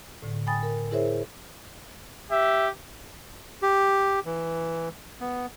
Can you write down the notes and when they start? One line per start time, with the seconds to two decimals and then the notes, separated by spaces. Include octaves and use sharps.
0.22 A2 D3
0.47 G5 G#5 B5 D#6 A6
0.63 A#4
0.91 E4 G#4 A#4 C5 C#5 E5
2.31 G4 E5
3.62 G4
4.26 E3
5.21 B3